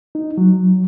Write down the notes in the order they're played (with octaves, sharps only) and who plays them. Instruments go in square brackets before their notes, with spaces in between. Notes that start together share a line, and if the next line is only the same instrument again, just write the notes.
[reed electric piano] D#4
F#3